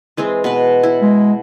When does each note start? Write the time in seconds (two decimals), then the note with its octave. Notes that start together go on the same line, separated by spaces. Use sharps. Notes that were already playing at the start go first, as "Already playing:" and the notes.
0.17 E3 G#3 C4
0.44 B2 B4
0.83 E4
1.02 G#3